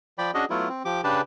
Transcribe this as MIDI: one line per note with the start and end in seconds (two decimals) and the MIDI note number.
0.18 0.31 53
0.18 0.31 74
0.18 0.31 79
0.18 0.31 83
0.34 0.45 61
0.34 0.45 62
0.34 0.45 66
0.34 0.45 68
0.34 0.45 75
0.50 0.69 54
0.50 0.69 57
0.50 0.69 59
0.50 0.69 64
0.50 0.69 65
0.69 0.83 60
0.85 1.01 53
0.85 1.01 67
0.85 1.01 86
1.04 1.21 49
1.04 1.21 62
1.04 1.21 67
1.04 1.21 71
1.04 1.21 81